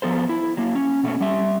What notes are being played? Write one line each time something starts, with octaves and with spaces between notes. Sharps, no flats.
F3 B3 A4 C5
E4
F#3 A#3
C#4
B2 A3 C#4
G3 E5